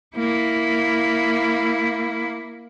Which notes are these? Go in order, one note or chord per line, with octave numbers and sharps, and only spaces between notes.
A#3 E4